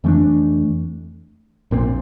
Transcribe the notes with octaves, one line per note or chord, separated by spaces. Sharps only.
F2 E3 A3 D4
A#1 A#2 F3 C4